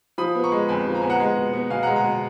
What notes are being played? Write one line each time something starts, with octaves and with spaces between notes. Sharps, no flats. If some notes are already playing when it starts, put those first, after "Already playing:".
F3 B5 D#6
B3
A#5 C#6
G#3
F2 G#5 B5
F3
A#5
B3 G#5
F#5 A#5
G#3
B2
B3
B2 F5 G#5
F#5 A#5
G#3
F#5 A#5
B2